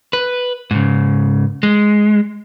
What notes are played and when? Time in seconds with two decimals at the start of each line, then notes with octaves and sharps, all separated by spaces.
0.13 B4
0.71 G#2 C#3
1.63 G#3